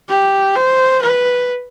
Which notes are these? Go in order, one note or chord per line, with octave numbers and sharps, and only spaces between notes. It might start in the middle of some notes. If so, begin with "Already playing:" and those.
G4
C5
B4